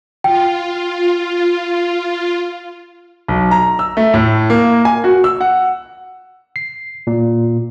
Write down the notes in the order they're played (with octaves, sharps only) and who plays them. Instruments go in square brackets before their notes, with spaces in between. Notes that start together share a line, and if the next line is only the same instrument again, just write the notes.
[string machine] F4 [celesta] G5
[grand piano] B1
A#5
E6
A3
A2
A#3
G#5
F#4
E6
F#5
[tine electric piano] C7
A#2